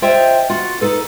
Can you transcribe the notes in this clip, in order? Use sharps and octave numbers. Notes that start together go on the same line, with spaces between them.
F4 C5 C#5 D#5 E5 G5
F4 F#4 F#5
D#4 A4 B4